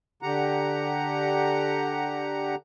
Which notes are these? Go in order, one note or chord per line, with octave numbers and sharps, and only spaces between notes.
D3 G4 F#5 A#5